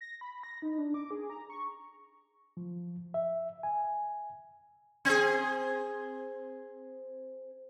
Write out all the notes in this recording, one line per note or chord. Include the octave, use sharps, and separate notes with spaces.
A#6
B5
A#6
D#4
D4
D6
G#4
A#5
C#6
F3
E5
G#5
C4 G#4